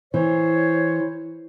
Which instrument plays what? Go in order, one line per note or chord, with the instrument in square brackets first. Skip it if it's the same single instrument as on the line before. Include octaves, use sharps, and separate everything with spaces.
[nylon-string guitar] E3 [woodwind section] C5 C#5